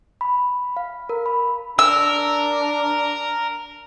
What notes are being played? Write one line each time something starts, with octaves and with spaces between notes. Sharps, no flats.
B5
F5
A#4
B5
D4 A#4 E6